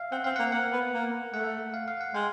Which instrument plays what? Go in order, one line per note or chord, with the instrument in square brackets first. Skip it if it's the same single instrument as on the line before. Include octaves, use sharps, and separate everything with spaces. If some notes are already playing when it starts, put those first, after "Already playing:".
Already playing: [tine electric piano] E5 F5
[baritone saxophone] C4 [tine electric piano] F#5
[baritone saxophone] C4 [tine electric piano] F5
[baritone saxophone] A#3 [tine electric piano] F#5
[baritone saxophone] A#3 [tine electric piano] F#5
[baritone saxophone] B3
A#3
[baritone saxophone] A3 [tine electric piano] F#5
[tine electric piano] F5
F5
F#5
[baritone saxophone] G#3 [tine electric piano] G5